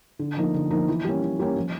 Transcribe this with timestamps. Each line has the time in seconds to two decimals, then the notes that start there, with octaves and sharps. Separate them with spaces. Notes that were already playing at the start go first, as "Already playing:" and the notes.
0.19 D3
0.37 F3 A#3 D#4
0.54 D3
0.71 F3 A#3 D#4
0.88 E3
1.05 G3 A#3 C#4
1.22 E3
1.39 G3 A#3 C#4
1.56 F3